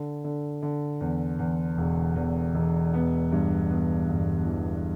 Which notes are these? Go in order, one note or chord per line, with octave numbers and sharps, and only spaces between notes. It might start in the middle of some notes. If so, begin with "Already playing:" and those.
Already playing: D3
D3
D3
E2
E2
E1
E2
E1
B3
G2
B3
G1
E3